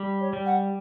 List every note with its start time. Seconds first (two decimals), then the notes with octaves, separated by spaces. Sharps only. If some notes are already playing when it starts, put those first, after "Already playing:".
Already playing: G3
0.20 C#5
0.33 G3
0.45 F#5